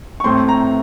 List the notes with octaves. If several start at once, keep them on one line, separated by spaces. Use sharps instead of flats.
C#6
A2 A3 C4 C6
A#5